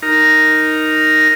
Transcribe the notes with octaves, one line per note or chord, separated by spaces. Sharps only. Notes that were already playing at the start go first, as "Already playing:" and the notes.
D#4 A#4